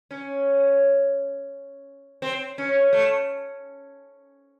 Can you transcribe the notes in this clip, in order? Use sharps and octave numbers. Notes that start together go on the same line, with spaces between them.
C#4
C4
C#4
A3